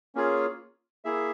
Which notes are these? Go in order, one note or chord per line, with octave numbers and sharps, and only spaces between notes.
A#3 C#4 F4 G#4 C#5
A#3 E4 G#4 E5